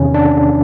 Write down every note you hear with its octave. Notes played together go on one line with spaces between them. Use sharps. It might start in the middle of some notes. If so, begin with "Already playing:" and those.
Already playing: E2 C3 D#3 C#4
D4